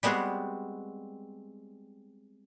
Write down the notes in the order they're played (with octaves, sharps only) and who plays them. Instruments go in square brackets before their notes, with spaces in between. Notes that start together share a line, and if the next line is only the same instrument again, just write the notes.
[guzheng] G3 G#3 B3 C4 F#4 G#4